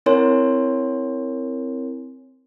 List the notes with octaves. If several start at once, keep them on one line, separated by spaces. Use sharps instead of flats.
C4 E4 A#4 C#5 G#5 C6